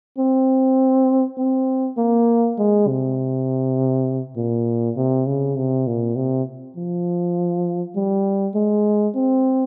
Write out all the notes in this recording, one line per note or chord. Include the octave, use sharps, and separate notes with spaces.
C4
C4
A#3
G#3
C3
A#2
C3
C#3
C3
A#2
C3
F3
G3
G#3
C4